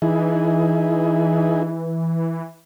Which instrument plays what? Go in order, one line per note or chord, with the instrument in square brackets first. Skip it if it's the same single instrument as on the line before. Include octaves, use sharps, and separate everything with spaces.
[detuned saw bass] E3 [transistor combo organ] D#4 E4 G#4